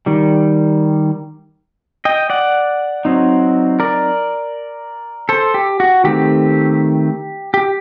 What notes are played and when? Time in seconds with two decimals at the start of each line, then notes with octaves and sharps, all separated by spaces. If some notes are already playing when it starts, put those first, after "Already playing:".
0.06 D#3 G3
2.05 D#5 G5
2.30 D5 F#5
3.05 F#3 C4 D#4
3.80 A#4 D5
5.29 A4 C5
5.54 G4
5.80 F#4
6.04 D#3 A3 C4 G4
7.54 G4